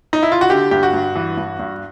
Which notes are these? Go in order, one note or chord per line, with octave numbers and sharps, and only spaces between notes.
D#4
E4
F4
F#4
D3 G4
G2 G4
F#4
G2
E3
G2
G2